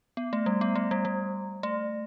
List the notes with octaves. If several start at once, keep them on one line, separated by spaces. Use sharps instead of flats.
B3
A3
G3
B3
A3
G3
G3
A3